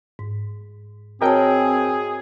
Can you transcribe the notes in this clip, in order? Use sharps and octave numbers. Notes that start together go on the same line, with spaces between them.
G#2
C4 F#4 G#4 A#4 C#5 D#5 G5 A5